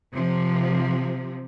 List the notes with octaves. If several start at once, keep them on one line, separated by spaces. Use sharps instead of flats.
C3 F3